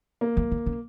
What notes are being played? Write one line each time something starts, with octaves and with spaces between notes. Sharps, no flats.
A#3
E3
D#3
C#3